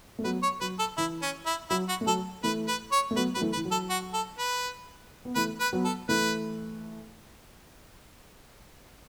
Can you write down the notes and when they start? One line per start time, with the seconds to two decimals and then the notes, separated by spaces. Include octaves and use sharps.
0.19 A3
0.24 F#3 B3 B4
0.43 C#5
0.61 F#3 B4
0.79 A4
0.97 E3 E4
1.22 C#4
1.47 E4
1.70 F#3 E4
1.89 F#4
2.01 A3
2.07 F#3 A4
2.43 E3 A3 B4
2.68 B4
2.92 C#5
3.11 A3
3.16 F#3 B3 B4
3.35 F#3 B4
3.41 E3 A3
3.53 B4
3.57 E3
3.65 F#3
3.71 A4
3.90 F#4
4.14 A4
4.38 B4
5.25 B3
5.36 E3 A3 B4
5.60 B4
5.73 F#3 B3
5.84 A4
6.09 E3 A3 B4